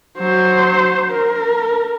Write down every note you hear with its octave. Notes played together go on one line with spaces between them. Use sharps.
F#3 C5
A#4